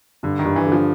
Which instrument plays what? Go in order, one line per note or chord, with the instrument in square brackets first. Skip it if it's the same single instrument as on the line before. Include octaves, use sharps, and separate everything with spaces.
[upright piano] G2 [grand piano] D3
[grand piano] D#3
[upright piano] G2
[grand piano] E3
[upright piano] D3
[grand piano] F3